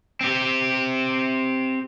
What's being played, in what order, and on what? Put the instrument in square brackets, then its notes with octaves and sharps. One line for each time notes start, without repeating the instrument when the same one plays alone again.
[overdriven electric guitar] C4 G4